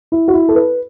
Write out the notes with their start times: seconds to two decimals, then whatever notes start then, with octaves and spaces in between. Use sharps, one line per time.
0.12 E4
0.28 F#4
0.34 E4
0.49 A4
0.55 B4